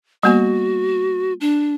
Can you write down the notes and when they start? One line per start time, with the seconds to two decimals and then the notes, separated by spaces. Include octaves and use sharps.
0.23 G3 A#3 B3 F#4
1.41 D4